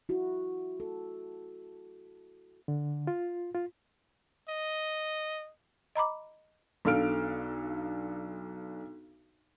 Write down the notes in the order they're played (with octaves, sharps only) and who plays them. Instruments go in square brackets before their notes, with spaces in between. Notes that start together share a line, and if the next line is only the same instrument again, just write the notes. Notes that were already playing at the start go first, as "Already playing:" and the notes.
[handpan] E4 F#4
A4
[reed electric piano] D3
F4
F4
[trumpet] D#5
[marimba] D#5 A#5 B5 D6
[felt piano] B1 D4 A4 F5 F6 D7